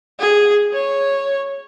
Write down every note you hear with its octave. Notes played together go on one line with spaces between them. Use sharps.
G#4
C#5